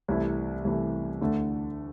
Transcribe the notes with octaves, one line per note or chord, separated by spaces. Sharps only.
C2 C3 E3 A3 E4
C2 C3 E3 A3 E4
D2 D3 A3